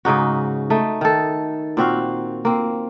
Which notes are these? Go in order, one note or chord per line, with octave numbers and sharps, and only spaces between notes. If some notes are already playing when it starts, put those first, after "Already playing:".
G#2 C#3 D#4 F#4
A3 D#4
D#3 A4
A#2 C4 F#4 F5
A#3 C4